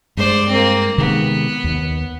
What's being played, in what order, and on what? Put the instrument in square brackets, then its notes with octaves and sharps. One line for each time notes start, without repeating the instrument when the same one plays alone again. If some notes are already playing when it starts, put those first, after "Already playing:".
[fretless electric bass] G2 G#3 [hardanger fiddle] C5 D5
[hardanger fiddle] A#3 C4
[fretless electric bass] C3 D#3 G#3 [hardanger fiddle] B3
[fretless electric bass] D#2